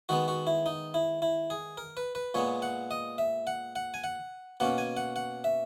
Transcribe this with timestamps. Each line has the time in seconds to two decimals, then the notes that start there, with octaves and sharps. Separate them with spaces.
0.09 D#3 G#3 B3 F#4
0.28 F#4
0.47 E4
0.66 D#4
0.94 E4
1.22 E4
1.50 G#4
1.78 A#4
1.97 B4
2.15 B4
2.34 A#2 G#3 B3 C#5
2.62 F#5
2.91 D#5
3.18 E5
3.47 F#5
3.76 F#5
3.94 G#5
4.04 F#5
4.60 B2 A#3 C#4 F#5
4.78 G#5
4.97 F#5
5.16 F#5
5.44 E5